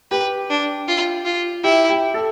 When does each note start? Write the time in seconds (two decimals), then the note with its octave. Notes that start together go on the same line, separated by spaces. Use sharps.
0.11 G4 B4
0.50 D4
0.88 F4
1.25 F4
1.64 E4 G4
1.89 G4
2.14 A4